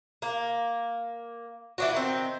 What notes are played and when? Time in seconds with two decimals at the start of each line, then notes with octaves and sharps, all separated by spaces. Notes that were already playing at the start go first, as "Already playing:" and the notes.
0.22 A#3
1.78 E3 D4 F#4
1.94 D#3 C4